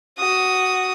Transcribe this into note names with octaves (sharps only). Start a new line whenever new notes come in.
F#4 D#6